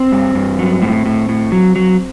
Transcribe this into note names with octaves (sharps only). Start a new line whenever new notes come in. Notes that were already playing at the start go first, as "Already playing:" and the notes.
Already playing: C4
G2
G2
F#3
A2
A2
A2
F#3
F#3